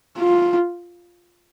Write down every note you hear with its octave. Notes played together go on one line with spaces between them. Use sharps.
F4